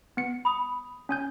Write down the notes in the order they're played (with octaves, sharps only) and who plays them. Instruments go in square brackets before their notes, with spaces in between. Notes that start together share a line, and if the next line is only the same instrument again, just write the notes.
[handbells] B3 C#7
[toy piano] B5 D#6
[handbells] C#4 G#5 G6